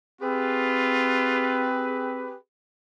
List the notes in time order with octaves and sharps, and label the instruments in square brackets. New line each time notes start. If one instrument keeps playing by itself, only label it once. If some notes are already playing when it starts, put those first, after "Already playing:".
[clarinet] C4 [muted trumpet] F4 [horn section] G4 G#4 B4